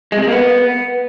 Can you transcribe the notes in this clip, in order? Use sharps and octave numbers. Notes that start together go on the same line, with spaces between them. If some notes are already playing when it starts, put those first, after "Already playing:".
G#3
C3
G#3
A#3
B3